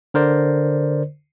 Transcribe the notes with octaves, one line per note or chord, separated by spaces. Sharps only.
D3 A#4 C5 D5